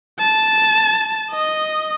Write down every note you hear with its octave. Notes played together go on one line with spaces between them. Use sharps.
A5
D#5